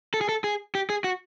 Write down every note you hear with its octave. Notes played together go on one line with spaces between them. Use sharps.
A4
G#4
A4
G#4
G4
G#4
F#4